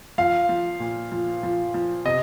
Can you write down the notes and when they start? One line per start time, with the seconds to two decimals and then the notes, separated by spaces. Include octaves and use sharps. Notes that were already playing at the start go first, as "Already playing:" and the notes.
0.18 F3 F5
0.49 F3
0.80 A#2
1.12 F3
1.43 F3
1.74 F3
2.05 C3 D#5